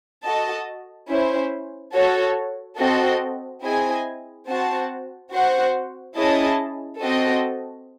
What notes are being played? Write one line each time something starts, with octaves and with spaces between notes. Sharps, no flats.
F#4 A4 D#5 A5
C#4 E4 C5
F#4 A4 C#5
C4 F#4 A4 D#5
C4 E4 G#4 D#5 G#5
C4 F#4 C5 F#5 A5
C4 F#4 C5 F#5
C#4 E4 G#4 D#5 A5
C4 F#4 A4 D#5